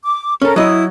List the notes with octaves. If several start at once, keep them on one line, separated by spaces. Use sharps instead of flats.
D6
C#4 A4 A#4
F#3 E4 D#5 D#6